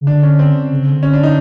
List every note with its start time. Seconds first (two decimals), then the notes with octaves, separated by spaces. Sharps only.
0.01 C#3
0.07 D3 D4
0.23 C#4
0.39 C4
0.70 C#3
0.81 C#3
0.92 D3
1.03 C#4
1.13 D4
1.23 D#4